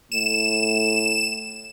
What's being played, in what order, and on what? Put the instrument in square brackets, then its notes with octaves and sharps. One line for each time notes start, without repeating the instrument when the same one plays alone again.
[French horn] A2 [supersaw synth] E7